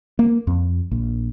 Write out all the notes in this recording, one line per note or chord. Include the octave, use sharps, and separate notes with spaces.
A#3
F2
A#1